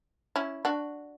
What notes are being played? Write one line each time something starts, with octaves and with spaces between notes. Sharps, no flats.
C#4 E4
D4 F#4